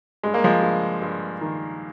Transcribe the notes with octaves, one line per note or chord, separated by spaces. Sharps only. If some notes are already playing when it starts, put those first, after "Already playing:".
G2 G#3
A#3
F3 G#3
G2
G2
D#3